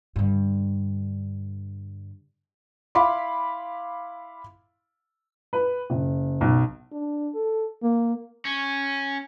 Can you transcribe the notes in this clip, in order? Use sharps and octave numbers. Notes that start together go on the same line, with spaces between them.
G2 D3
E4 F5 B5 C6 D6
B4
F#1
B1
D4
A4
A#3
C#4